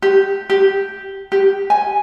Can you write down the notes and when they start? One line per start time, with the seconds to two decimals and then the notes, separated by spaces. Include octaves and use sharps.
0.02 G4
0.50 G4
1.32 G4
1.70 G#5